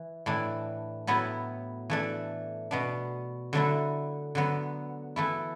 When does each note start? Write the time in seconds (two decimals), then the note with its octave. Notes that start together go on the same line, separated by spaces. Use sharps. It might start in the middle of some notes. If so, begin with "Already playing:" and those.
Already playing: E3
0.26 A2 E3 D4
1.07 A2 F#3 B3 E4
1.90 E3 A3 D4
2.71 B2 B3 D4
3.53 D3 F#3 A3 E4
4.35 D3 F#3 B3
5.16 E3 A3 E4